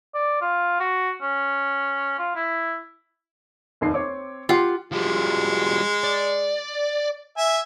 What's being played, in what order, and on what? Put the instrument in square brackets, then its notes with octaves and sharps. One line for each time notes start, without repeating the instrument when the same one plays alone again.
[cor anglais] D5
F4
F#4
C#4
F4
E4
[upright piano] F1 D#2 C7
C4 C#5 D6
[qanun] F4 [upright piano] G4 F#5 C6
[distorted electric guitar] F3 G3 [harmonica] G#3
[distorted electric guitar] D5
[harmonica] E5 G#5